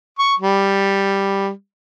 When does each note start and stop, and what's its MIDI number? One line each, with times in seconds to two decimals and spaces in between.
0.19 0.34 85
0.40 1.49 55